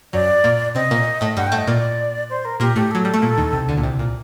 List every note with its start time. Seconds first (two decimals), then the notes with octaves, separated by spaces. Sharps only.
0.13 F#2 F#3 D5
0.44 A#2 A#3
0.75 C3 C4 D#5
0.91 A#2 A#3
1.21 A2 A3
1.37 G2 G3 F#5
1.47 G5
1.52 A2 A3
1.58 D#5
1.67 A#2 A#3 D5
2.30 C5
2.45 A#4
2.60 A#2 A#3 G4
2.76 A2 A3 G4
2.91 F#3 A4
3.05 G3
3.14 A3
3.22 A#2 A#3
3.38 D#2 D#3
3.52 C2 C3
3.68 D2 D3
3.77 A#2
3.83 C2 C3
3.99 A#2